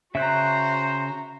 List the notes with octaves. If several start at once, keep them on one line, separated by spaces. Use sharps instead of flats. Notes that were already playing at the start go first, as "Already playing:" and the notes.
C#3 F#4 C5 E5 A#5 F#6